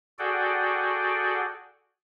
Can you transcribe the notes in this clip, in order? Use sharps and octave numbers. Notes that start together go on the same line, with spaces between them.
F#4 G#4 A4 D5 F#5 G5